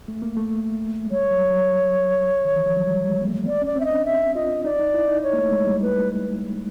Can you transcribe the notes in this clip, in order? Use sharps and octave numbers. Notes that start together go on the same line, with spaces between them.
A3
A#3
A3
G#3
G3 C#5
F#3
F#3
D#3
E3
F3
F#3
G3
G3
G#3
A#3
A3
B3 D5
C#4
D5
C4
E5
D#5
D4
E5
F4 D#5
D#4 D5
D#4
E4
D#4
C#5
A#3
A3
G#3
G3
B4